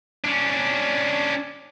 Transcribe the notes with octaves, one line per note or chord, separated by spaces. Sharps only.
C#4 D4